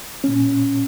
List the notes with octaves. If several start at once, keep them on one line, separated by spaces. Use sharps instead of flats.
A#2 C#4